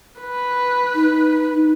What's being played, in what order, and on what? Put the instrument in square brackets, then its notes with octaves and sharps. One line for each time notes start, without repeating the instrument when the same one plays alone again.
[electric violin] B4
[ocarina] D#4